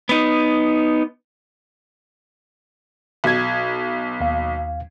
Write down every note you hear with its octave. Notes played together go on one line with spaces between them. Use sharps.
B3 D#4
B1 G#6
D#2 F5